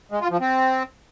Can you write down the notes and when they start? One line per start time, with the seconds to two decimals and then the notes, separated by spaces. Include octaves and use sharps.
0.12 G#3
0.21 F4
0.31 F3
0.40 C4